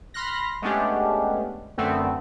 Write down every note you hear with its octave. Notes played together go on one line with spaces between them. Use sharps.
B5 C6 F6 F#6 A#6
G#3 A3 B3 C#4 D4 G4
F#2 D3 A3 B3 C4